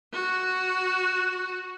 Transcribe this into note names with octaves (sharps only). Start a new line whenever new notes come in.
F#4